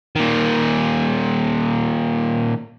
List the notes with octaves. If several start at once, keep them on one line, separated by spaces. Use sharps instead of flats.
A#2 D#3